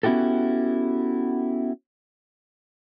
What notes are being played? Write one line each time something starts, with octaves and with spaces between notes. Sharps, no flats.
B3 C#4 E4 F#4 G4 A4